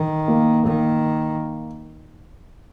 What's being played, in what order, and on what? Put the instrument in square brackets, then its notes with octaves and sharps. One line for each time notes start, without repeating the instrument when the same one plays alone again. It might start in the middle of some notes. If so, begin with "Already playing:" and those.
Already playing: [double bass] D#3
[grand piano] A#3
[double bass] D#3 [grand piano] A#3